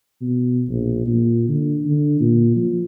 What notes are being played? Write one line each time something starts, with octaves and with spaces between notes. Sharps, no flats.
B2
A#1
A#2
D3
D3
A#2
F3